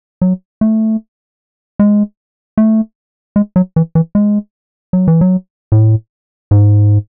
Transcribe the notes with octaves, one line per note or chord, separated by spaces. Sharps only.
F#3
A3
G#3
A3
G#3
F#3
E3
E3
G#3
F#3
E3
F#3
A2
G#2